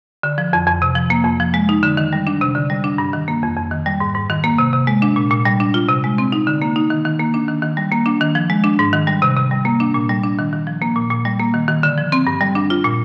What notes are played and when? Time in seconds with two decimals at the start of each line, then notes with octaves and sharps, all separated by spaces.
0.23 D3
0.38 F3
0.53 F2
0.67 F2
0.82 C3
0.95 F3
1.10 A#3
1.24 F2
1.40 F3
1.54 G#3
1.69 D#4
1.83 D3
1.97 D#3
2.13 G3
2.27 D4
2.41 C3
2.55 D3
2.70 G3
2.84 D4
2.98 G2
3.13 D#3
3.28 A#3
3.43 F2
3.57 F2
3.71 D#3
3.86 G3
4.00 G#2
4.14 G#2
4.30 D#3
4.44 A#3
4.58 C3
4.73 C3
4.87 G#3
5.02 D4
5.16 A#2
5.30 A#2
5.45 G3
5.60 D4
5.74 F4
5.89 C3
6.04 G#3
6.18 C4
6.32 D#4
6.47 D3
6.62 A#3
6.76 D#4
6.90 D#3
7.05 D#3
7.19 A#3
7.34 D4
7.48 D#3
7.63 D#3
7.77 G3
7.92 A#3
8.06 D4
8.21 D#3
8.35 F3
8.50 G#3
8.64 D4
8.79 G#2
8.93 D#3
9.07 G3
9.22 C3
9.37 C3
9.51 G3
9.65 A#3
9.80 D4
9.94 A#2
10.09 G3
10.23 D4
10.39 D#3
10.53 D#3
10.67 F3
10.82 A#3
10.96 A#2
11.10 A#2
11.25 G3
11.39 A#3
11.54 D#3
11.68 D#3
11.83 D3
11.98 F3
12.12 C4
12.27 G2
12.41 G3
12.55 D4
12.70 F4
12.84 A#2